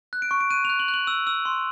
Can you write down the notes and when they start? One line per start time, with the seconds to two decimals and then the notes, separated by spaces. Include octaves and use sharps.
0.13 F#6
0.22 D7
0.31 C#6
0.41 D7
0.50 F#6 D#7
0.65 F7
0.70 F#6
0.80 F#7
0.88 F#6
0.94 F#7
1.07 E6
1.27 E6
1.45 C6